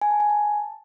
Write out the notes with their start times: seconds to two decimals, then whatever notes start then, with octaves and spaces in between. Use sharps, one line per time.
0.01 G#5
0.11 A5
0.20 G#5
0.29 A5